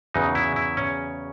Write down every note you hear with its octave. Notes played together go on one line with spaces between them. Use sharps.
E2 C#3 F#3 D#4
E4
E4
C#4